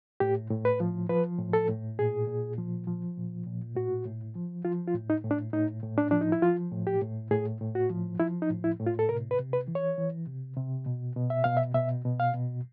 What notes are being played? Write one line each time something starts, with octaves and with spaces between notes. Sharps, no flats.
A2 G4
A2
B4
F3
F3 B4
A2
A4
A2
A#2 G#4
A#2
F3
F3
A#2
A#2
A2 F#4
A2
F3
F3 F4
F4
A2
D#4
A2
D4
A2 D#4
A2
D4
F3 D4
D#4
E4
F3 F4
A2
G4
A2
A2 G#4
A2
F#4
F3
F3 E4
D#4
A2
E4
A2
F4
A4
C3 A#4
B4
C3
B4
E3
C#5
E3
C3
C3
B2
B2
E5
B2 F5
E5
B2 E5
B2
F5
B2